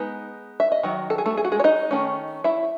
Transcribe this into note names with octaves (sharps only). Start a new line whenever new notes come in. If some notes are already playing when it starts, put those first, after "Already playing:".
Already playing: G#3 B3 D#4
E5
D#5
D#3 F#3
A4
G#4
A3 A4
G#4
F#4
G#3 G#4
C#5
D#4 D#5
D#3 A3 C#4
E4 E5